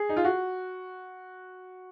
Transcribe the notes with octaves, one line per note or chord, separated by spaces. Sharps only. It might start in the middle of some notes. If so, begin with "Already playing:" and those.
Already playing: G#4
D#4
F4
F#4